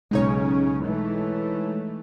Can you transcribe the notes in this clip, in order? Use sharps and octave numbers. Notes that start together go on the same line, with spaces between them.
B1 C#3 G#3 C#4 D#4 C#5
E3 A3